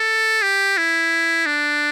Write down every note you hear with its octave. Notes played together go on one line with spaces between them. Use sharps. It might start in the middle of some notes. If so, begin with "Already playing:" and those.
Already playing: A4
G4
E4
D4